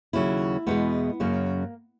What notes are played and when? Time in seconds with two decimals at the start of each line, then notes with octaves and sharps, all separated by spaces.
0.13 D#2 C#3 F#3 E4
0.66 E2 B2 G#3 B3
1.20 F#2 C#3 F#3 A#3